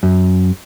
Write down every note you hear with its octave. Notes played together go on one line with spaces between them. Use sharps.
F#2